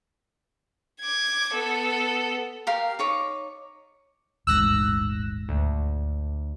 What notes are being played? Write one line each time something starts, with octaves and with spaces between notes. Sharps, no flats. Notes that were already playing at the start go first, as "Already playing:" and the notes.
D6 G#6
B3 A4
G4 A#4 F5
D#4 C#5 D6
D#1 A1 G#2 E6 F#6 A#6
D2